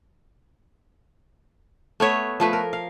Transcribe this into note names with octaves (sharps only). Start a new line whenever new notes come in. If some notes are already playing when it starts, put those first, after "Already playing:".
A3 B3 C#5 E5
F3 A3 B4
A#4
F5